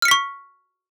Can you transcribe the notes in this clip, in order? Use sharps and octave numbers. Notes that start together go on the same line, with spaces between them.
C#6 F6 B6 C#7